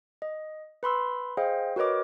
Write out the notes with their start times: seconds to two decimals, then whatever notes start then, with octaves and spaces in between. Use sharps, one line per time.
0.22 D#5
0.83 B4 B5 C6 E6
1.37 G#4 C5 D#5 F5 G5
1.76 F#4 A#4 B4 C#5 D#5 D6